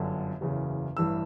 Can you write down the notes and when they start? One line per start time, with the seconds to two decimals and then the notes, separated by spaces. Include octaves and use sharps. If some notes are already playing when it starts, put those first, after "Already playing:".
Already playing: G1 F#2 D3
0.41 F#1 E2 C#3
0.97 A1 G2 E3 E6